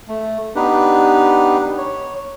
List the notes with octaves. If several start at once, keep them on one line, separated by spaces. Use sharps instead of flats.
A3
B3 D4 D#4 G4 B4
C#5